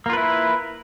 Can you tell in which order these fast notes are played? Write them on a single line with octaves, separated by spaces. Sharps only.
A#3 F4 B4 E4